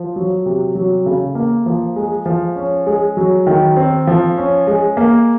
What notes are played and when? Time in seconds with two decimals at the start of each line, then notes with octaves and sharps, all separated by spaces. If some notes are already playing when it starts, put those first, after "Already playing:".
Already playing: F3
0.16 F#3
0.46 C3
0.75 F#3
1.06 C#3
1.35 A#3
1.66 F3
1.96 G#3
2.26 F3
2.56 C#4
2.86 G#3
3.17 F#3
3.47 D#3
3.77 C4
4.07 F3
4.38 C#4
4.67 G#3
4.97 A#3